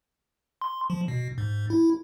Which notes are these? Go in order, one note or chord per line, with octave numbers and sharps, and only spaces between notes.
C6
F3
B2
G#2
E4